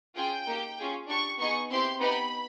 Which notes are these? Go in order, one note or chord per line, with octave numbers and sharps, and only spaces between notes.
C#4 F4 G#4 G5
A#3 D#4 G4
C#4 F4 G#4
D4 G4 C#6
B3 D#4 G#4 C#6
C4 E4 G4 C6
B3 D#4 G4 B5